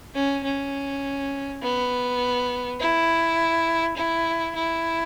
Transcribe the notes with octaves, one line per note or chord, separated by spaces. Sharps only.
C#4
C#4
B3
E4
E4
E4